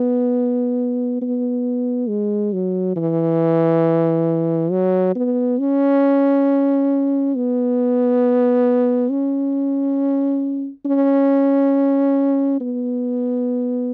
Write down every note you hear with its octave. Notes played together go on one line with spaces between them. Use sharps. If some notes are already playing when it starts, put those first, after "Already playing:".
Already playing: B3
B3
G#3
F#3
E3
F#3
B3
C#4
B3
C#4
C#4
B3